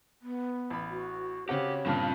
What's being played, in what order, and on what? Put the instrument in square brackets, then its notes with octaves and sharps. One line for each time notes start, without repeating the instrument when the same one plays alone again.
[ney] B3
[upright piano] A1 B5
[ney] F#4
[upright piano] C#3 C4 F#5 [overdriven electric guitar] G4 [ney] C#5
[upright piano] G2 A#2 C#3 [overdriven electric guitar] C4 A5